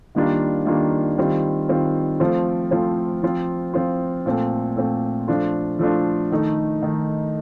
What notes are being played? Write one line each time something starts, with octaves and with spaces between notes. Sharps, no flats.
D#3 G3 A#3 D4 F4
D#3 G3 A#3 D4 F4
D#3 G3 C4 F4
D#3 G3 C4 F4
F3 A3 C4 F4
F3 A3 C4 F4
F3 C4 F4
F3 C4 F4
A#2 A3 C4
A#2 A3 C4
F3 A3 D4 F4
F3 A3 D4 F4
D#3 A3 D#4
D#3 A3 D#4